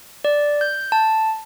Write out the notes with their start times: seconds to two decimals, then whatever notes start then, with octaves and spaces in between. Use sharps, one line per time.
0.25 D5
0.61 G6
0.92 A5